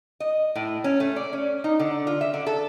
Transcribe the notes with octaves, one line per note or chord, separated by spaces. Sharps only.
D#5
A2
C#4
A3
D5
C#4
D#4
D3
F4
E5
D3
A4